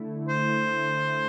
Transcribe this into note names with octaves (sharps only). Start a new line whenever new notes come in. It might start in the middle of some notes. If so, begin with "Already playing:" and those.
Already playing: D3 A3 E4
C5